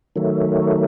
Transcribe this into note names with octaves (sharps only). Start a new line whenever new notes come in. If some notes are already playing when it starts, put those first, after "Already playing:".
D#3 F#3 A3